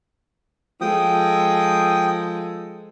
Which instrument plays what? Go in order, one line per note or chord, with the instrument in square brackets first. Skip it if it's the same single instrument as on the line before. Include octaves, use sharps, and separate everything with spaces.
[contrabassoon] F3 [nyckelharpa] G#3 A4 [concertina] G5 D#6